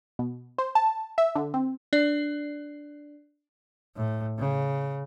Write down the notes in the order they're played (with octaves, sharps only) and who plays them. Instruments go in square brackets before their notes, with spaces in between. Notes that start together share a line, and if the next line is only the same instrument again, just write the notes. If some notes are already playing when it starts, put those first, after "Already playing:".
[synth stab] B2
C5
A5
E5
D3
C4
[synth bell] D4 D5
[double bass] A2
C#3